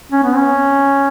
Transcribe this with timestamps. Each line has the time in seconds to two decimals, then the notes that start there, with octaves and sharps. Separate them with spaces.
0.12 C#4
0.23 B3
0.37 C#4